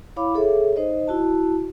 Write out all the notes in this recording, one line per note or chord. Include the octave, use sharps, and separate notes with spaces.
E4 C#5 F5 B5 D6
G#4 A4 C#5 E5
D#4 C5 D#5
E4 F#4 A5